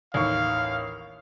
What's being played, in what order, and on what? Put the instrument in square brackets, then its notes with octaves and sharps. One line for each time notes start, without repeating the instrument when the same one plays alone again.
[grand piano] A1 D#2 C#6 [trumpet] F5